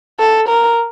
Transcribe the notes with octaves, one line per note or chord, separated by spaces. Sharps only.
A4
A#4